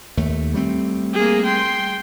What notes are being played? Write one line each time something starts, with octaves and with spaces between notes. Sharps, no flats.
D#2 A3
G3 A3 C4
A#3 G#4
G5 C6